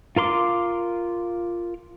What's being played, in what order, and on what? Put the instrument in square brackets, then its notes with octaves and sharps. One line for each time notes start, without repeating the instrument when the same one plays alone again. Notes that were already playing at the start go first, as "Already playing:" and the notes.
[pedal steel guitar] F4 A#4 C6 D6